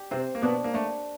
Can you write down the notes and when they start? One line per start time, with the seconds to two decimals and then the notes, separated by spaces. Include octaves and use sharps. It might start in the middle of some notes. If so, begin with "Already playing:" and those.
Already playing: D4 G4
0.11 C3 C4 C5
0.35 A#3
0.42 B2 B3 D4
0.64 A#3
0.73 A3 D4